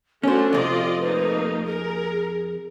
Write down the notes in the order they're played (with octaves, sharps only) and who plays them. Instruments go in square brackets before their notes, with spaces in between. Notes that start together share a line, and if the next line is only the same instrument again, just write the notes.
[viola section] A3 D4 F#4 [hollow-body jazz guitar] C#4 C5 [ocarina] A4
[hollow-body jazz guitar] F2 C3 [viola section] F4 D5 D#5
[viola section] A3 A#3 D#4 [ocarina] B4
[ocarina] G#4 [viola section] A#4